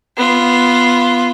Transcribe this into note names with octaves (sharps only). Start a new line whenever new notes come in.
B3 F4